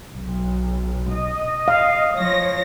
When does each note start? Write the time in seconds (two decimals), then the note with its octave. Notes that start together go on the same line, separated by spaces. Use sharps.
0.15 B1
1.15 D#5
1.68 F5
2.17 F3 C#5 A#6